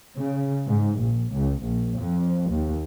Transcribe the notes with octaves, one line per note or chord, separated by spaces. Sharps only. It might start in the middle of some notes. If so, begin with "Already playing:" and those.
C#3
G#2
A#1
C#2
A#1
F2
D#2